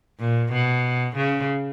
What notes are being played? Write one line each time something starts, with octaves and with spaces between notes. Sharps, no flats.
A#2
B2
C#3